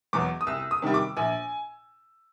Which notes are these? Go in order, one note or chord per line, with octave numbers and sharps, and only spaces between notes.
E2 B2 F#3 D6
D#6
C2 E6
D#6
C3 D#3 G3
D6
A#1 G#5